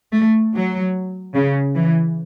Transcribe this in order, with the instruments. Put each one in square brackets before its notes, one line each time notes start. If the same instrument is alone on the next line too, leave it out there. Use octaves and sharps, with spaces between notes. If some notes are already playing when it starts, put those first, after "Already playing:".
[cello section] A3
F#3
C#3
E3